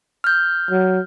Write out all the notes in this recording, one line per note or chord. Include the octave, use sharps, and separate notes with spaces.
F6 G6
F#3